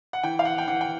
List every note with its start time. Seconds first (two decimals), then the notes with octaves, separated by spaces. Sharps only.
0.13 F#5
0.23 E3 G5
0.39 F5
0.45 F#5
0.58 G5
0.68 E3 F#5
0.81 G5